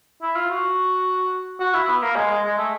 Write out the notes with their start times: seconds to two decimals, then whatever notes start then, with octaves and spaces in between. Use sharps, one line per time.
0.22 E4
0.36 F4
0.50 F#4
1.60 F#4
1.74 E4
1.88 B3
2.02 A#3
2.15 G#3
2.30 G#3
2.43 G#3
2.58 A3